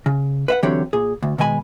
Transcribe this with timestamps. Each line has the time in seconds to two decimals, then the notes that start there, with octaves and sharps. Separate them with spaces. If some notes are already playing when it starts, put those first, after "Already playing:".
0.06 C#3
0.48 B4 E5 F#5
0.63 D3 E3 F#3 C4 G4 C#5
0.93 A#2 G#4
1.23 D2
1.38 B2 D#3 G#3 G#5 B5